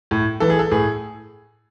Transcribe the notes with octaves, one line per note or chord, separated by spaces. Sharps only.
A2
E3 A4
G#4
A4
A2 G#4